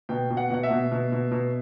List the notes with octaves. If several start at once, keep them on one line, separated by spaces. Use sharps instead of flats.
B2 G5
B2
F#5
B2 F#5
E5
B2
B2
B2
B2